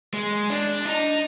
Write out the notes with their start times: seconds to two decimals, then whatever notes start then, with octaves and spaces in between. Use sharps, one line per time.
0.14 G#3
0.50 D4
0.85 D#4